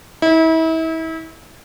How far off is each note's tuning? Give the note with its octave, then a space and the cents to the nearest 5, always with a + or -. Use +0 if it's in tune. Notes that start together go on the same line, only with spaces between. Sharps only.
E4 -35